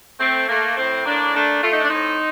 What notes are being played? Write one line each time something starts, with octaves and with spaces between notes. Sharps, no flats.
A3 C4
A3 A#3
A2 C4
A2 A#3 D4
A3 A#3 D4
A3 F4
D#4
D4
A2 C4 D#4